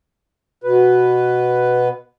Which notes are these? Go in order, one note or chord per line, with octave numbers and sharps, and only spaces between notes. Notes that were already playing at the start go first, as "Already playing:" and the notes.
B2 B4